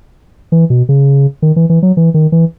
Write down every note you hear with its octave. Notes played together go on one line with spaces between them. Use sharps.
E3
B2
C#3
D#3
E3
E3
F#3
E3
D#3
E3